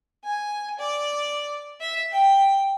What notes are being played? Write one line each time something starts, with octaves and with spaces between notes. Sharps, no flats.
G#5
D5
E5
G5